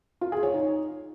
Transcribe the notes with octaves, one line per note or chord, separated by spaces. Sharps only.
F4
G#4
C#5
D#4